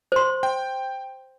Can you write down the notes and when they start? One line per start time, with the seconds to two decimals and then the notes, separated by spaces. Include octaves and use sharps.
0.12 C5 C6
0.43 G5